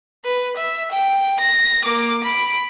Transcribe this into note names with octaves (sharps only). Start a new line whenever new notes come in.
B4
E5
G5
A#6
A#3 D6
B5 D7